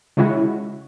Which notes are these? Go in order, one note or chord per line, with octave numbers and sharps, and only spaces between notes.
C#3 G#3 C#4 E4 F#4